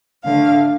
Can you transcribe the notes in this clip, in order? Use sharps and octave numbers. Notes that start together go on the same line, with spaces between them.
D3 A3 F5